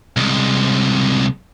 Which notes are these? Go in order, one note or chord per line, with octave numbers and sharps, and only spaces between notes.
C2 G#3